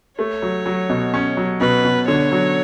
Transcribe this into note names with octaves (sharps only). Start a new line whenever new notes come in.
A3 C#5
F#3
F#3
B2
C#4
F#3
B2 B4
B2
D3 C#5
F#3